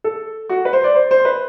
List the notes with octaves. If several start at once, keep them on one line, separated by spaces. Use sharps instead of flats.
A4
F#4
B4
C5
D5
C5
C5
B4